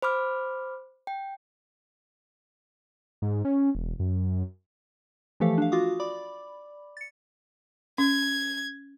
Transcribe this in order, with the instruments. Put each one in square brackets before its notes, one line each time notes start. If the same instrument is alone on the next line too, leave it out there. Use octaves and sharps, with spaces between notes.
[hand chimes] C5 B5 D6 F6
G5
[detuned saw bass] G#2
C#4
E1
F#2
[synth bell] E3 F3 A3 G4 A4 F5
D4 F5
F4 F#4 F5 D6 D#6
D5 B5 D6
A6 C#7
[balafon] C#4 [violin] G#6